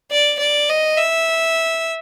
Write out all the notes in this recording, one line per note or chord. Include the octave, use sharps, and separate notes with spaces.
D5
D5
D#5
E5